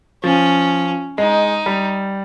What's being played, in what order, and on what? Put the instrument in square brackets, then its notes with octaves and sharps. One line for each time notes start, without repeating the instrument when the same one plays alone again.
[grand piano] F3 [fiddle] C#4
[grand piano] G#3 [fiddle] D#4
[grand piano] G3